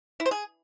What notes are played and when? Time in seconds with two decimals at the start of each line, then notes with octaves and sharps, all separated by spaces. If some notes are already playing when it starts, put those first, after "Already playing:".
0.20 E4
0.26 C5
0.31 G#4